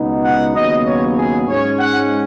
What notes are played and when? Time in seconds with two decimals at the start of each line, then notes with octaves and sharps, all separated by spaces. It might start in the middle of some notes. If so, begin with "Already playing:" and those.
Already playing: C#2 B2 B3 D#4
0.24 F#5
0.55 D#2 C#3 F#3 B3 D#5
0.85 C#5
1.16 G#4
1.47 G#2 G#3 C#4 C#5
1.78 F#5